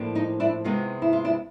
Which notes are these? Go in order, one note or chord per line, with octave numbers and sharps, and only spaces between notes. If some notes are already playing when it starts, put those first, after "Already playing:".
Already playing: A2 F3 A#3 D4
D#4
D4 E4
C3 D#3 G#3 B3 D#4 F4
E4
F4
D4 E4